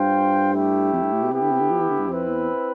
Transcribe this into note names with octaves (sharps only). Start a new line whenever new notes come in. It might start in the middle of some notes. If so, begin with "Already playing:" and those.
Already playing: G2 F4 C5 G5
A3 E4 G4
F2
G2
A2
B2
C3 B3 E4 G4
D3
C3
D3
F3
E3
D3
G2
F2 C4 E4 B4
E2